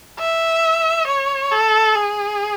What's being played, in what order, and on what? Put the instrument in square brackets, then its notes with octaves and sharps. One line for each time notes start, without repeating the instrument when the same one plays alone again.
[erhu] E5
C#5
A4
G#4